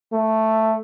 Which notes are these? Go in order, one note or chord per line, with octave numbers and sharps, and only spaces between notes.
A3